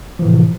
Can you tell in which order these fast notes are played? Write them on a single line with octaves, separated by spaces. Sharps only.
F3 E3 A2 C3